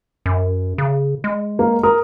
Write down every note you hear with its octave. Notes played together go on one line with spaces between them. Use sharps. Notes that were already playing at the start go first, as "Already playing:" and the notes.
F#2
C#3
G#3
A#3 F5
A#4 D#6